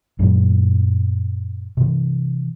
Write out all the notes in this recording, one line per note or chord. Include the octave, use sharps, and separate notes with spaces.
F#2 A#2 F#3 A3
C3 E3